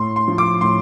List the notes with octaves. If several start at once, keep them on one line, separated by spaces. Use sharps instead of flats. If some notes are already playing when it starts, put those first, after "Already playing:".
Already playing: A2 C6
C6
F3
D6
A2 C6